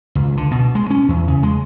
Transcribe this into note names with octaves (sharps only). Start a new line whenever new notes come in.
C#2
D3
B2
G#3
C#4
E2
C#3
G#3